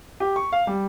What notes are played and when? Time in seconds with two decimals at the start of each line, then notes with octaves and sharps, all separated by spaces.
0.20 G4
0.36 C#6
0.52 F5
0.67 G3